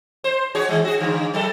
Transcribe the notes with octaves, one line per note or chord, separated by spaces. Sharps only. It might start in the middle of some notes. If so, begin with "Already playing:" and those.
C5
F#4 G#4 C#5
D#3 G#3
F#4 G#4
G#2 D3
F#3 A4